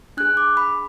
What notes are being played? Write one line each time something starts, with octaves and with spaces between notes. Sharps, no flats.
D4 G#4 F#6
D6
B5